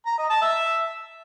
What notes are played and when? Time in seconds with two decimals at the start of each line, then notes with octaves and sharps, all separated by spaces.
0.06 A#5
0.18 D#5
0.30 A5
0.41 E5